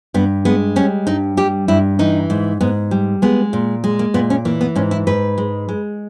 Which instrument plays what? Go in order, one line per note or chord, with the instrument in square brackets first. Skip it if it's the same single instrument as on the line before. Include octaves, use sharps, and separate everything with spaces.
[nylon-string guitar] G2 B3
G#3 B3
G3 C#4
G2 D#4
G3 G4
G2 E4
E3 D#4
G#2
G#2 B3
G3
G#3 B3
A#2
G#3
A#3
A#2 B3
C#4
E3 A#3
B3
G#2 C#4
E4
G#2 B4
G#3
G#3